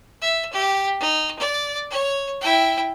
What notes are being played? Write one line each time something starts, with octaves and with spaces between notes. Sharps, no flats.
E5
G4
D#4
D5
C#5
E4 G5